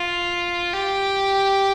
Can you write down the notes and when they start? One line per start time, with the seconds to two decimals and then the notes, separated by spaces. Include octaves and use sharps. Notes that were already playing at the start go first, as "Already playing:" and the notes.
Already playing: F4
0.74 G4